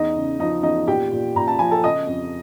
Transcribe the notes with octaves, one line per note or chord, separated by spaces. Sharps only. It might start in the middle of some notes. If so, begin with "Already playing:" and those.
Already playing: E2 D#4 D#5
C#3
F3 D#4 D#5
E2 D#4 D#5
A#2 G4 G5
A#2
A#2 A#5
A5
F3 G#5
A4 A5
C#3 D#5 D#6
F2